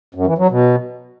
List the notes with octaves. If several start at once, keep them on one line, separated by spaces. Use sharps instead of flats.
F#2
E3
F#3
B2